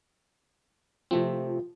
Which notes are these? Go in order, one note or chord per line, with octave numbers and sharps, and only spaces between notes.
C3 F3 A3 C4